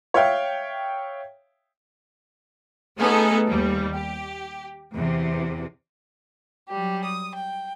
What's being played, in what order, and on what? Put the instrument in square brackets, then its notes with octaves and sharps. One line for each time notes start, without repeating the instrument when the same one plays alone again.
[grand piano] C#5 E5 F5 G5
[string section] A3 B3 C#4 D#4 G#4 A4
D#2 G3
G4
E2 C3
[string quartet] F#3 G3 G4
D#6
G5